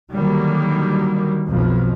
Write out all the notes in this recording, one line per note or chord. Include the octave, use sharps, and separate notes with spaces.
D3 D#3 F#3 G3 A#3
B1 F2 F3